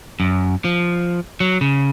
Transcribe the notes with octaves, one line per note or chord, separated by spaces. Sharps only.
F#2
F3
F#3
C#3